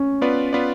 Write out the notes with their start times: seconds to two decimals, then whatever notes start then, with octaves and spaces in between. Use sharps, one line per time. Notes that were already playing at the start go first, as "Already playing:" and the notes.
Already playing: C#4
0.22 B3 F4 B4 D5
0.53 B3 F4 B4 D5